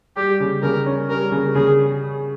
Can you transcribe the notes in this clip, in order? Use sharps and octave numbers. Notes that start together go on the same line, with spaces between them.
G3 G4
C#3
C#3 A#4
C#4
G3 A#4
C#3
C#3 G#4